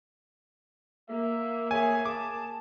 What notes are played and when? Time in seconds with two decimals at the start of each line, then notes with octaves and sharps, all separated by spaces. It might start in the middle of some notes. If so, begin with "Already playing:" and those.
1.09 A#3 E5
1.71 G#4 C#5 E5 G#5
2.05 G#4 A5 D6